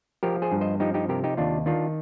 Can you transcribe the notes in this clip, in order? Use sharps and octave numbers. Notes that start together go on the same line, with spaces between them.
F3 G4 A#4
G#4 C5
G2
C5 D#5
F3 D#4 G4
D#4 G4
C3 G4 A#4
D#4 G4
D#2 D4 F4
D#3 D4 F4